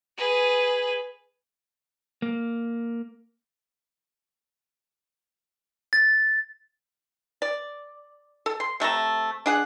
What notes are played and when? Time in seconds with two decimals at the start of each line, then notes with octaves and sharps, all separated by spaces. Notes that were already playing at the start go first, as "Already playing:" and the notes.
0.18 G#4 B4
2.22 A#3
5.93 A6
7.42 D5
8.46 A4
8.60 C6
8.80 C3 A3 A5 A#5
9.46 D4 G#4 F#5